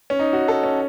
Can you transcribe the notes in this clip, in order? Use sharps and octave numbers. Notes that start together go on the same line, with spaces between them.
C#4
D#4
F#4
A4
C#4